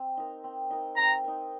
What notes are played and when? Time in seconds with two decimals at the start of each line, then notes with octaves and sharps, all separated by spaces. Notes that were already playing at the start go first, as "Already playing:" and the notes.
Already playing: C4
0.17 D#4 A#4
0.44 C4
0.70 D#4 A#4
0.97 C4 A#5
1.24 D#4 A#4